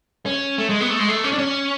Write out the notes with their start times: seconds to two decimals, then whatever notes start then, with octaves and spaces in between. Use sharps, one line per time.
0.26 C#4
0.58 A3
0.69 G#3
0.81 B3
0.90 A3
0.99 G#3
1.08 A3
1.24 C#4
1.32 D4
1.38 C#4